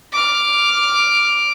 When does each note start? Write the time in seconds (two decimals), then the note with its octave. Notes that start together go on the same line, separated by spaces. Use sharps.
0.12 D6 F6